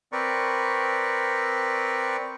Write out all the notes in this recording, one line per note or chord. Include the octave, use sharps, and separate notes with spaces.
C4 A#4 B4 D5 C#6